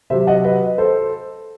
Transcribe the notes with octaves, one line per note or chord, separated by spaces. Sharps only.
C3 F#3 C5 E5
D#5 F#5
B4 D#5
A4 C5